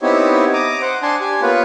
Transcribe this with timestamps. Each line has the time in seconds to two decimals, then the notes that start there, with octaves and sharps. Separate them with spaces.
0.01 B3 C4 D#4 E4 G4 C#5
0.53 A#5 D6 D#6
0.81 C5 F#5
1.02 D4 G#5 A5 C6
1.21 G4 G#5
1.42 A#3 B3 F4 B4 C#5